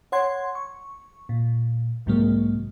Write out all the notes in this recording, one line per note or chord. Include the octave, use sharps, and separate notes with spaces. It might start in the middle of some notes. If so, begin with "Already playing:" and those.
C#5 F#5 C6 G#6
C#6
A#2
B1 G#2 C3 F#3 G#3 A#3